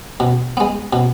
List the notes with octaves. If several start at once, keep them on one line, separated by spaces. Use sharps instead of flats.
B2
G#3 B3
B2